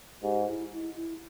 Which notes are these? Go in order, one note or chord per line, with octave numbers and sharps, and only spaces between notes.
G#2 G4
E4
E4
E4